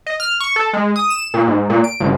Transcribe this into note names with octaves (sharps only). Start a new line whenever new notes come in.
D#5
F6
C#6
A4
G#3
D#6
E7
A#2
G#2
A#2
D7
G1